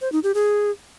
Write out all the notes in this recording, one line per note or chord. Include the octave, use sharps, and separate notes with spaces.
C5
D#4
G4
G#4